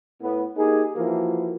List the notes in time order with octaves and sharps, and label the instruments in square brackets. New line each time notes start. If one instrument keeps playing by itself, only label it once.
[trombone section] A2 B3
A#3 D#4 G4 G#4
E3 F3 A#3 E4 F#4